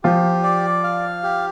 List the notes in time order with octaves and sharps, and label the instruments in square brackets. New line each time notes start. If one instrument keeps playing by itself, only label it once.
[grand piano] F3 F4 [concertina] G4
[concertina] D5
F5
G4